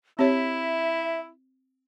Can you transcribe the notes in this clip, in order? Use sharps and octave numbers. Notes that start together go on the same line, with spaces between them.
C4 E4 G4 C#5 E5